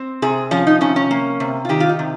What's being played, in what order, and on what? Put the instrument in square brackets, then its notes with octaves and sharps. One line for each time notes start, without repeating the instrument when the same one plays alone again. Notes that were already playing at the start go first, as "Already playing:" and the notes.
Already playing: [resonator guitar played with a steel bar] C4
C3 G#4
F3 C#4
D#4
C3 C#4
C#4
A#3
C3
F4
D#3 G4
F4
D#4
C3